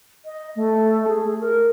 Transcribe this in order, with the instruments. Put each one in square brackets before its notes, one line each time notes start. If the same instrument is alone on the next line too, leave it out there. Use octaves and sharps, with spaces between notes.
[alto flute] D#5
A3
G#4
A#4